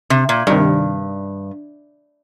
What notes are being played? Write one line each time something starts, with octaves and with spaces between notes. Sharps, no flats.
C3
A#2
G2 C3 D#3 G3